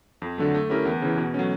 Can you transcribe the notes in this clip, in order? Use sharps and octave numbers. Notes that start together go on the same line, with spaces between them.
F2
D3 F#3 A3
A3
C#4 E4 G4 A#4
E2
C#3 E3
B2
F#3 A3 C#4